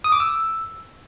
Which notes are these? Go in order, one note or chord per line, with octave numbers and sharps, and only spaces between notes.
D#6
D6
E6